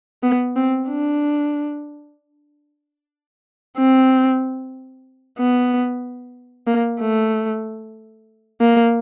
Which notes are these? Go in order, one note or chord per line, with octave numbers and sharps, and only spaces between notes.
B3
C4
D4
C4
B3
A#3
A3
A#3